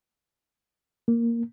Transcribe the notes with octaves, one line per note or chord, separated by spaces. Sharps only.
A#3